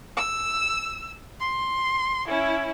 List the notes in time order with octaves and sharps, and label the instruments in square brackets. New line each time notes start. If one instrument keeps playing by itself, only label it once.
[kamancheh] E6
C6
C#4 E4